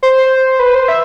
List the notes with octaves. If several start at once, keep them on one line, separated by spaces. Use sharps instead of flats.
C5
B4
C5
E5